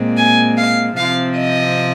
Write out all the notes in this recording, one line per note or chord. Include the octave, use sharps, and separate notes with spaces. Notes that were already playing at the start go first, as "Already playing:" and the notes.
Already playing: A#2 G#3 C4
G#5
F5
C3 F3 C4 F5
D#5